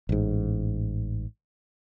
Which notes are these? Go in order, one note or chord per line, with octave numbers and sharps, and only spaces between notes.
A1 G#2